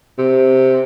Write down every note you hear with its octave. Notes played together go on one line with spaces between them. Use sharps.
C3